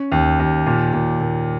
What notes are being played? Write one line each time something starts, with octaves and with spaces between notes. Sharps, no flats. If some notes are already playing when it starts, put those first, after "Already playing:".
Already playing: C#4
D#2
D#2
A#2
A#2
A#2